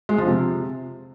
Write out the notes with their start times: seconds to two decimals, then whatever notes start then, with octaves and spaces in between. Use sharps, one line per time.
0.09 G#3
0.18 F3
0.28 C3